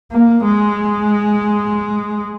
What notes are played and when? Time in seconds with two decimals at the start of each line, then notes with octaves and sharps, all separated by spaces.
0.12 A#3
0.44 G#3